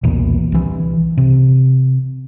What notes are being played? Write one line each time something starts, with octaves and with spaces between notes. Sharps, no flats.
B1 E2 A#2
C2 E3
C3